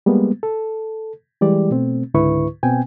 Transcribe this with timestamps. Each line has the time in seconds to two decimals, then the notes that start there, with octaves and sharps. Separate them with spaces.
0.06 G3 G#3 A#3 B3
0.43 A4
1.41 E3 G3 G#3 G4 D5
1.71 B2 A3 C4
2.14 C#2 G#2 D3 E4 B4 C#6
2.63 B2 B3 C4 G5 G#5